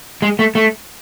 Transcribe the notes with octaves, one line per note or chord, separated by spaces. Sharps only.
G#3
A3
A3